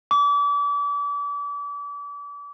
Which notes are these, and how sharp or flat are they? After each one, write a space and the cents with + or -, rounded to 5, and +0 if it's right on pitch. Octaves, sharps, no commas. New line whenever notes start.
D6 -35